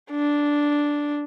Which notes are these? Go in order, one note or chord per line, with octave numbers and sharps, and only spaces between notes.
D4